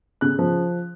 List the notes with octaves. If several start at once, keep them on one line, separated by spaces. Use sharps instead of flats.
C#3 F#6
F3